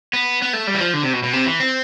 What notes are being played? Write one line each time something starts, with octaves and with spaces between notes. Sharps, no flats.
B3
B3
A3
G3
E3
F3
D3
C3
B2
B2
C3
E3
C4